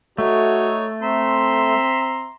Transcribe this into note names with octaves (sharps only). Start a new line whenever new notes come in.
A3 D#4 F#4 C#5
C4 E5 A#5 C6